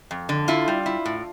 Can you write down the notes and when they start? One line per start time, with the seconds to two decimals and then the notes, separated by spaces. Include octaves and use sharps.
0.11 F2
0.29 D3
0.48 E4 F4
0.68 G3
0.86 E4
1.05 A2